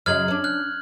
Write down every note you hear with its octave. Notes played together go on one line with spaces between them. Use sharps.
F#2 C#3 D#4 F6 G#6 F#7
C#4 D4
F6 F#6